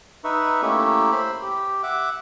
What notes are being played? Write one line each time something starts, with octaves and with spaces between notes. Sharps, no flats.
D#4 B4 E5 C#6
A3 A#3 C#4 E4 G4
C5 E5 B5
G4
E5 F#5 D6